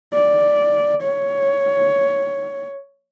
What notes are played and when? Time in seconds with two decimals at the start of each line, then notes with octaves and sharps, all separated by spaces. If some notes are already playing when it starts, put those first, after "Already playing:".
0.14 D5
1.03 C#5